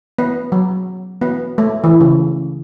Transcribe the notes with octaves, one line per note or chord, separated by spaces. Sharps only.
B3
F#3
B3
A3
E3
C#3